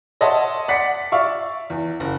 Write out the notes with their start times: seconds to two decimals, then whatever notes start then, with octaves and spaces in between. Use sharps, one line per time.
0.21 C#5 D#5 E5 F#5 A5 C6
0.68 D5 F#5 B6 C#7
1.12 D5 E5 F5 C#6
1.70 E2
2.00 F#1